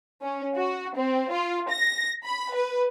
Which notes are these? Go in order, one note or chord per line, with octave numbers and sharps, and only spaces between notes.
C#4
F#4
C4
F4
A#6
B5
B4